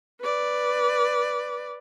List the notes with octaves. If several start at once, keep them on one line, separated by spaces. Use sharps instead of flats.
B4 D5